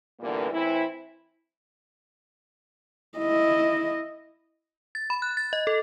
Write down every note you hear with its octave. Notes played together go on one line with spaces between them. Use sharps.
A#2 D3 E3 G3 A#3 B3
A2 E3 C4 E4
E4 D#5
A6
B5
F#6
A6
D#5
A4